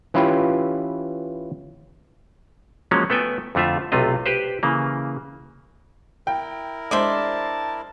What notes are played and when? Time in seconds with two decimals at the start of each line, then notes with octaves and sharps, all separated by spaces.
0.14 E3 C#4 E4 F4 G4 B4
2.91 F3 F#3 G#3 A#3 C#4
3.10 A3 B3 A4 G5 G#5
3.55 F2 D3 A3 F4 E5
3.92 B1 C3 A3 F4 D#5
4.26 G4 B4 C5
4.63 C#3 E3 A#3
6.27 E4 A#4 G5
6.91 G#3 D4 C5 D5 E5 A5 C6